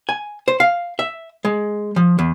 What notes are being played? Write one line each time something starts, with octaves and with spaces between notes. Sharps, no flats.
G#5
C5
F5
E5
G#3
F3
E2